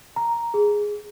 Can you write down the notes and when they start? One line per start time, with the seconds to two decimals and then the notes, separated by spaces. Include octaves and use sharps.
0.16 A#5
0.54 G#4